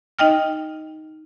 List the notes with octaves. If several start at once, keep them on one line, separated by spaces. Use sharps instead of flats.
D#4 D#5 G5 F6